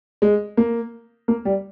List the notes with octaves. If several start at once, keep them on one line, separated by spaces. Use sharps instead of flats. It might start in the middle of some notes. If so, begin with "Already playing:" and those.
G#3
A#3
A#3
G3